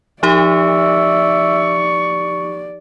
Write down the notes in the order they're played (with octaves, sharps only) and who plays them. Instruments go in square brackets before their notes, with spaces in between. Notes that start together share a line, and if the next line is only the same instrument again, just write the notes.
[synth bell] F3 D#4 G4 [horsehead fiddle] D5 [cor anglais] E5 [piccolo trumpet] C#6